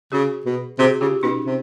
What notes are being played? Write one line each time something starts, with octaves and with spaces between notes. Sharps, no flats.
C#3 F#4 G#4
B2
C3 F#4 G#4
C#3 F4 G4
B2 C#4 D#4
C3